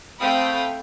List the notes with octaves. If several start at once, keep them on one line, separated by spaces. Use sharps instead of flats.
A3 C4 F5 G5 B5 D#6